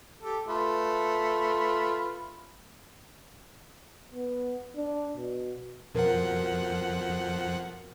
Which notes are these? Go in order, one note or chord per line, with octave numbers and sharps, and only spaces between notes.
G4 A4
A3 F4 B4
B3
D4
B2
F2 B2 F3 A#4 F#5